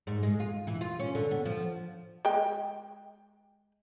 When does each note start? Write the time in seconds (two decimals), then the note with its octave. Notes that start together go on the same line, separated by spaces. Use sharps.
0.07 G#2
0.23 G#3
0.40 F4
0.67 E3
0.81 F4
0.99 C#4
1.15 D3
1.31 B3
1.45 F3
2.25 G#3 G5